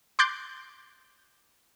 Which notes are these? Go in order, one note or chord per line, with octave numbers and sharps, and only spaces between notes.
C6 D6 F#6 G6 A6